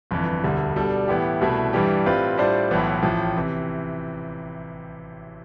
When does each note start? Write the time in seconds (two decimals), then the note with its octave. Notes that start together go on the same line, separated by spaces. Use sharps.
0.11 G1 F2 E3
0.44 E1 D2 D3 G3
0.76 B2 G3 D4 A4
1.08 A2 E3 B3 E4 G4
1.41 C2 B2 A3 E4 B4
1.73 G2 E3 G3 D4 G4
2.05 A2 G3 C4 F4 B4
2.38 A2 G3 D4 F4 C5
2.71 B1 A2 E3 B3
3.03 A1 A2 F3
3.37 C3 E3